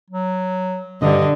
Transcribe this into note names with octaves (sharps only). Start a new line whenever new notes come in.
F#3
G2 D3 D#5